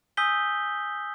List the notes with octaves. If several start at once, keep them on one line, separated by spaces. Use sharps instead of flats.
G#5 D#6 E6 G6 B6 G7